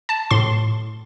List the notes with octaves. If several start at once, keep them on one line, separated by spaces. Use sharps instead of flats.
A5
A2 C6